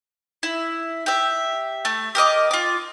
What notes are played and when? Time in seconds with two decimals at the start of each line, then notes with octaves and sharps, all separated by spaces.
0.43 E4
1.06 G4 E5
1.85 A3
2.15 G4 A#4 D#5 D6
2.51 F4 D6